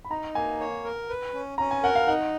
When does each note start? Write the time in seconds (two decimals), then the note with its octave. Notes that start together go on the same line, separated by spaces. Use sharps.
0.05 B5
0.10 D#4 A#5
0.35 A#3 G#5
0.60 C#5
0.85 A#4
1.09 B4
1.34 C#4
1.58 C#4 A#5
1.71 G#5
1.83 A#4 F#5
1.95 F5
2.08 D#4 F#5